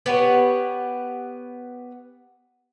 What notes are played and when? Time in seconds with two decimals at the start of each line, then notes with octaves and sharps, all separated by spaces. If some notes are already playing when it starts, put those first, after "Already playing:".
0.06 B3 G4 B4 C#5